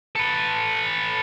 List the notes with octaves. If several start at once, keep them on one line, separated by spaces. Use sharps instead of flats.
A4 B4